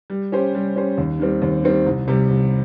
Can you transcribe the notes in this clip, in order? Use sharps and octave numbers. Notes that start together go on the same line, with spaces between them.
G3
C#4 G4 C5
G3
C#4 G4 C5
D#2
D#3 G3 C4
D#2
D#3 G3 C4
C2
C3 G3
C2